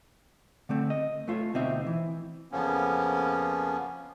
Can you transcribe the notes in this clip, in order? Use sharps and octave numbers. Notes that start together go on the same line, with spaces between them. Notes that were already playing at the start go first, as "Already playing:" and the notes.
D3 A3 C4
D#5
A3 F4 A4 C#5
D2 B2 C4 D#4 E5
E3
F2 C#3 F3 A#3 B3 C#4